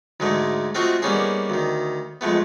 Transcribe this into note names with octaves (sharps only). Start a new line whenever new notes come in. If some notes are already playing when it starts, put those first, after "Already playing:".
D2 G#2 G#3 A3
A3 C4 F4 F#4 D#5 E5
G3 A#3 B3 C#4 D#4 G#4
D2 D#3
F2 G#3 A3 B3